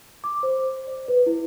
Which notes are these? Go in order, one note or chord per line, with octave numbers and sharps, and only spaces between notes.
D6
C5
D5
B4
E4